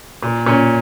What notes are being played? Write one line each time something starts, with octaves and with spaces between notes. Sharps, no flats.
A#2
A#2 C#4